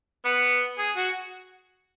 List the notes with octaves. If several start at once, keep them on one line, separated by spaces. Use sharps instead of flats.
B3
G#4
F#4